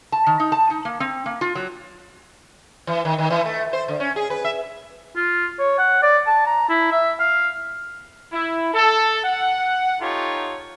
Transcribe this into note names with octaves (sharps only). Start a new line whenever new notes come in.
A5
D#3
D#4
A5
D#4
A#3
C4
A#3
F4
F#3
E3
D#3
D#3
E3
A3
C5
D3
C#4
G#4
B4
E5
F4
C#5
F#5
D5
A5
A#5
E4
E5
F5
E4
A4
F#5
D#4 F4 G4 A4 C#5